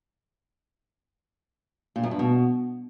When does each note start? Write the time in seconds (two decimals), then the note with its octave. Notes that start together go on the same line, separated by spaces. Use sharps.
1.96 A#2
2.03 F#2
2.11 G2
2.19 B2